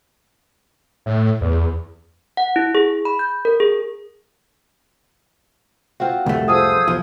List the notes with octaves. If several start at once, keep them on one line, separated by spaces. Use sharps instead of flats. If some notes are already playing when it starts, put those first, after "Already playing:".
A2
E2
F#5
E4
G#4
B5
G6
A#4
G#4
C4 F4 F#4
C2 F2 A3
F4 G#4 A4 C5 D#6 E6 G#6
B1 E2 F3